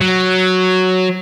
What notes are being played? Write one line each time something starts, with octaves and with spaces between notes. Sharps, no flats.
F#3